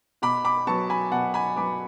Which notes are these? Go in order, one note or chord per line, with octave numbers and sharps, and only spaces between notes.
B2 B5 D6
B5 D6
F#3 B3 A5 C#6
G#5 B5
B2 F#5 A5
G#5 B5
F#3 B3 B5 D6